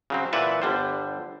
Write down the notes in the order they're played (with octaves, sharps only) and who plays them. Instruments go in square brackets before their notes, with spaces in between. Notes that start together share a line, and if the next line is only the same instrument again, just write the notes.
[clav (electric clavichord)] C#3 F#3 C4
A#2 E3 B4 D5 E5 F#5
G1 D3 G3 C5